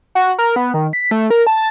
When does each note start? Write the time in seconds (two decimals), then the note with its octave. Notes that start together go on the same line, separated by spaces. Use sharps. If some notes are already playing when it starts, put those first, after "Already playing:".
0.15 F#4
0.38 A#4
0.56 B3
0.74 D#3
0.93 B6
1.11 A3
1.30 A#4
1.47 A5